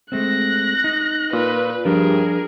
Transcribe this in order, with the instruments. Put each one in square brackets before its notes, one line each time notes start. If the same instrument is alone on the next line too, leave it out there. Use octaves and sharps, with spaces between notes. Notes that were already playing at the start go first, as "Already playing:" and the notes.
[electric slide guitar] G#3 A3 C4 [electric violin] F#6 A#6
[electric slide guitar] D#4
[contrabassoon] A#2 [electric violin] B4
[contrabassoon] G2 [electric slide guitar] F3 D4 G4 [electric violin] G#4 A#4